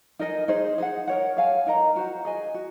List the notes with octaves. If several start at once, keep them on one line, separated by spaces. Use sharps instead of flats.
D#4 A#4 D#5 G#5
D#4 G#4 C5
D#4 G#4 C5 F#5
A#4 C#5 F#5
G#4 C#5 F5 G#5
D#4 A#4 D#5 A#5
F#4 C5 F#5
G#4 D#5 G#5
F#4